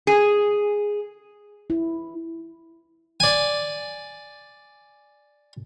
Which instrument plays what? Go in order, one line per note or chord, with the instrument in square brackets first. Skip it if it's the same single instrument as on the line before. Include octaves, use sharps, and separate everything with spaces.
[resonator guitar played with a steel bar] G#4
[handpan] E4
[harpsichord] D5 G#5